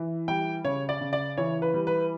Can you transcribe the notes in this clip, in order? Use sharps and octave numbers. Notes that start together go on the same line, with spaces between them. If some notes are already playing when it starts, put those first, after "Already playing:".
Already playing: E3
G3 G5
C#3 C#5
D5
C#3
D5
E3 C#5
B4
G3
B4